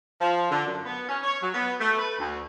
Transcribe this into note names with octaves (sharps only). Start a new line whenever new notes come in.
F3
D3
F#2
B3
C#4
C#5
F#3
B3
A3
B4
D2